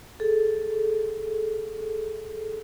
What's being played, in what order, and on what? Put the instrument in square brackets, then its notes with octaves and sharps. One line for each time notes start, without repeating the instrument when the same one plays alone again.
[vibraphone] G#4 A4